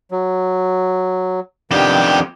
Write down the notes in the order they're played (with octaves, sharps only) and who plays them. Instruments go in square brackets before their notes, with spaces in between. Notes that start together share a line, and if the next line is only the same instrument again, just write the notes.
[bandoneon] F#3
[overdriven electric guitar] F2 G4 [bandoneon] D#3 B3 D4